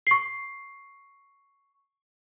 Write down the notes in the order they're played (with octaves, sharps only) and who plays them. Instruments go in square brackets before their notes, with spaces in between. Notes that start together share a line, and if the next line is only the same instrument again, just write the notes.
[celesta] C#6 C7